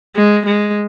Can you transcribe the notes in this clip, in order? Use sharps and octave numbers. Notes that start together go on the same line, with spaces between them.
G#3
G#3